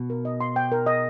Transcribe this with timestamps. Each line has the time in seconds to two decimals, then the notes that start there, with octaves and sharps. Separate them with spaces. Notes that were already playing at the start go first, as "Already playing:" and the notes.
Already playing: B2
0.10 A#4
0.25 D#5
0.41 C6
0.56 G5
0.72 A#4
0.86 D#5